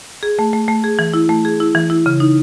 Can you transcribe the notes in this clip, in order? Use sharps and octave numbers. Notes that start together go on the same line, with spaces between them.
G#4
A3
A3
A3
G#4
E3
E4
A3
G#4
E4
E3
E4
C#3
D#4